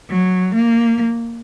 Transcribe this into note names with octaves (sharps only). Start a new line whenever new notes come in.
F#3
A#3